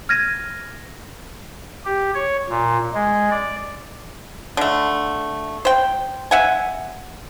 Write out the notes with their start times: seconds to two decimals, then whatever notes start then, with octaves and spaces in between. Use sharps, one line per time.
0.09 F6 G#6 A#6 D#7
1.85 G4
2.14 C#5
2.49 A#2
2.94 G#3
3.31 D5
4.57 D3 A3
5.65 C5 G5
6.31 E5 F#5 G#5